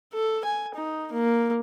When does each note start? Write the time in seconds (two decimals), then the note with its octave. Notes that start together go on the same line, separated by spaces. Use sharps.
0.13 A4
0.45 G#5
0.75 D#4
1.12 A#3